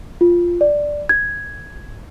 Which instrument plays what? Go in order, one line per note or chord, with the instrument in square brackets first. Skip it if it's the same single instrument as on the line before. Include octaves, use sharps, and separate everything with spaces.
[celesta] F4
D5
G#6